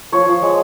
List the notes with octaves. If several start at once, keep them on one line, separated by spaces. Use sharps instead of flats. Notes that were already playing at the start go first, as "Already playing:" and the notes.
F3 C#5
F3
G#3